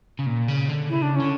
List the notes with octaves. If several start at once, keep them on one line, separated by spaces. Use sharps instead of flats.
C#3
A#2
C#3
D3
C#3 E4
D4
D3 C#4